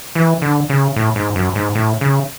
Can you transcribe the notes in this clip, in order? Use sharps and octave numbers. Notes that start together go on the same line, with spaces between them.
E3
D3
C#3
A2
G#2
F#2
G#2
A2
C#3